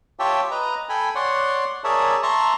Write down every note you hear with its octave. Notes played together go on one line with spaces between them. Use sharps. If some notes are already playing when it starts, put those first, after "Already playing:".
F4 G4 C#5 E5 G5 A5
B4 D#5 A#5
A4 G5 G#5 B5
C#5 D5 F#5 C6
G#4 A#4 C#5 D5 E5 A5
E5 A5 A#5 C6 C#6